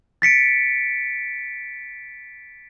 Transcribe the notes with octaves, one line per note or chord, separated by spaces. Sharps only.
A6 B6 C#7 D7